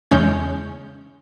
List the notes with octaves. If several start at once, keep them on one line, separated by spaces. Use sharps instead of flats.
E2 C#3 G#3 C#4 G6